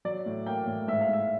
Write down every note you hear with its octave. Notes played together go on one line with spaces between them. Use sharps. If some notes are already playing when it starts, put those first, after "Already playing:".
F#3 D5
A2
A#3 G5
A2
G#2 E5
F5
G#2 E5